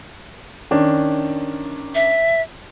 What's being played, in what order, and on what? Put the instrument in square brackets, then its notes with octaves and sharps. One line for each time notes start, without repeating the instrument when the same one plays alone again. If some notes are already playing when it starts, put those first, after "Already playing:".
[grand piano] D#3 C#4 D4
[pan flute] E5